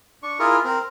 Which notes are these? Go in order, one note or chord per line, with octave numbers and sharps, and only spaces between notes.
D4 C#6
E4 F4 G#4 A#4
C4 A#4